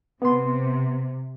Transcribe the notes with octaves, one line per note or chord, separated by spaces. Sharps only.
C3 B3 C6